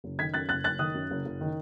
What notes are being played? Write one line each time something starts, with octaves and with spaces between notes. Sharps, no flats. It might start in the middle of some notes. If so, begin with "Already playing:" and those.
F#1
D#3 G#6 B6
F#2 F#6 A6
F#1 F#6 A6
F#1 F#6 A6
D#3 D#6 F#6
F#2
F#1
F#1
D#3